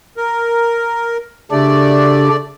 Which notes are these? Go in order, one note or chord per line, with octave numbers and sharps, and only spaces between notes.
A#4
C#3 A3 D4 G4 D5